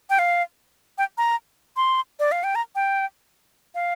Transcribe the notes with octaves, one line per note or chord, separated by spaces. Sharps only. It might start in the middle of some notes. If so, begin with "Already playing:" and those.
G5
F5
G5
A#5
C6
D5
F5
G5
A#5
G5
F5